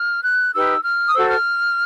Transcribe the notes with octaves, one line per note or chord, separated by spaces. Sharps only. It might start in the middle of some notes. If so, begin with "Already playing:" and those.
Already playing: F6
F#6
D#4 G4 B4 E6
F6
D#6
F#4 A4 C5 E6
F6